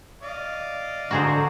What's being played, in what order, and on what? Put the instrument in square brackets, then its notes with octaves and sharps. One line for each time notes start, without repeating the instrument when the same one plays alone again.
[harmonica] D5 D#5 F5
[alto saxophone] D3 [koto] F#4 G#4 C5 [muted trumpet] A#5